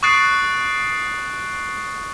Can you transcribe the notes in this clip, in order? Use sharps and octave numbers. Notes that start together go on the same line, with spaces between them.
C#6 D#6 F#6 A6 C7 D7